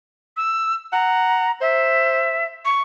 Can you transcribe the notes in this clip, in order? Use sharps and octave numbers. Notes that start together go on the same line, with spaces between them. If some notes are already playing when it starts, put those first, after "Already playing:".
E6
F#5 A#5
C5 E5
C#6